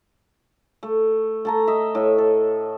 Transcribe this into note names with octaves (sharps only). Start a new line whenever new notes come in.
A3
A3 A5 A#5
D#5 E5
A2
A4